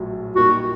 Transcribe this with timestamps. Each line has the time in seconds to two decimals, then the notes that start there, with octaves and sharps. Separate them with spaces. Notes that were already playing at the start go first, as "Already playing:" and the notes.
Already playing: A#1 A2 F#3
0.35 A#2 G3 A#3 D#4 F#4